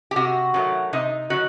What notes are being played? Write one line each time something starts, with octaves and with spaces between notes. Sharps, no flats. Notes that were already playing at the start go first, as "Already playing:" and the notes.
G4
C3 F#4
D#3 F#3 A3
C3 D#4
D#3 F#3 F#4